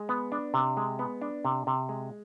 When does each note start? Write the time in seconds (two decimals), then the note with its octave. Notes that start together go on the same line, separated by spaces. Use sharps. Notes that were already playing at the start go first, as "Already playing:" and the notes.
Already playing: G#3
0.09 B3
0.32 D4
0.54 C3
0.77 G#3
0.99 B3
1.22 D4
1.45 C3
1.67 C3
1.89 G#3